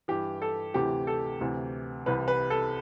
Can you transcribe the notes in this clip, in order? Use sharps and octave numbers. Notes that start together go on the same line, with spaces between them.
G2 E3 G4
A4
D2 C3 E3 G4
A4
D2 C3 E3
C2 C3 E3 B4
B4
A4